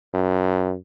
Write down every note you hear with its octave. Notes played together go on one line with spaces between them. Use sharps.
F#2